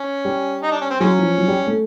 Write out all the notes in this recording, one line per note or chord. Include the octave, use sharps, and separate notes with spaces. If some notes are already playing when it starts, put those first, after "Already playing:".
Already playing: C#4
G3
D#4
D4
C#4
C4
F#3 G#3 C#4
F3
F#3
G3
A3